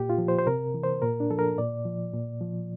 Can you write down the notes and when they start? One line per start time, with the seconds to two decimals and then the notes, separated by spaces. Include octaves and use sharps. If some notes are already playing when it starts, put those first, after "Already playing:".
Already playing: A#2 G4
0.10 F4
0.18 F3
0.28 C5
0.39 C5
0.47 C3 A#4
0.74 E3
0.83 C5
1.02 A#2 A#4
1.20 D4
1.31 F3 A4
1.39 A#4
1.58 A#2 D5
1.85 F3
2.14 A#2
2.41 F3